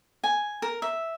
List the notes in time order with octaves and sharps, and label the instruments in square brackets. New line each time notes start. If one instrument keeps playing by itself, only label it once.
[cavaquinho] G#5
A#4
E5